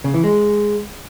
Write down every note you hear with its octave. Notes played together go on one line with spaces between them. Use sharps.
C#3
E3
G#3